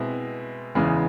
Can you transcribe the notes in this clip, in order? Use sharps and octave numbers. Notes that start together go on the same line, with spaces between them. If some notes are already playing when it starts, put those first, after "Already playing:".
Already playing: B2 G#3 C4 E4
E2 C#3 E3 G#3 B3